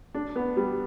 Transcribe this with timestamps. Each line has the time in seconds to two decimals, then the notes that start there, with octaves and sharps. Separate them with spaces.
0.14 D4
0.36 B3
0.57 G3